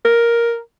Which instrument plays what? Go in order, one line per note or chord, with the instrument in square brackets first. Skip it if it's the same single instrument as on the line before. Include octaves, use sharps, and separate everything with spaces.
[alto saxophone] A#4